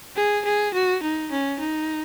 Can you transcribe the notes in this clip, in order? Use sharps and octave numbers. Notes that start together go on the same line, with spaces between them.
G#4
G#4
F#4
D#4
C#4
D#4